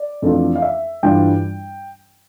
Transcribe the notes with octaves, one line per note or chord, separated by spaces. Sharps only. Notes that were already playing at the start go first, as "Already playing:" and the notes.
Already playing: D5
F2 E3 A3 D4 F4
F5
E5
G2 E3 G3 D4 F4 G5